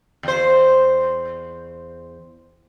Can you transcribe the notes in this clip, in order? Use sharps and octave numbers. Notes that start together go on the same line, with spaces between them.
E2 C5